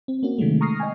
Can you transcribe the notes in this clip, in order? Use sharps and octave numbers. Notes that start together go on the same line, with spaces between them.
C4
A#3 C#4 F#4
C3 D#3 F#3 G#3 A3
A#5 C#6 D#6 F6 A#6 C7
D#5 G5 G#5